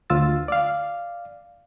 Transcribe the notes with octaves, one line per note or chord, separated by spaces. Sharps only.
D2 F4 E6 A6
D5 F5